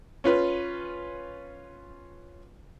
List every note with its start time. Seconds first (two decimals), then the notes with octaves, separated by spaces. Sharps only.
0.24 C#4 F4 B4